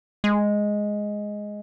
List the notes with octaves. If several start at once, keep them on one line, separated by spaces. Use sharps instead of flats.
G#3